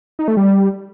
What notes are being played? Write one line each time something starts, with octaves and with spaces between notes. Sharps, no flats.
D#4
A3
G3